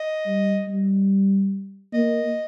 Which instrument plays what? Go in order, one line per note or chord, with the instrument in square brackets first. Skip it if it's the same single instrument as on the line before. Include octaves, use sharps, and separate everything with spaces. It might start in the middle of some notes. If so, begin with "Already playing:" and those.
Already playing: [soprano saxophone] D#5
[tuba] G3
G3
[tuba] A#3 [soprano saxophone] D#5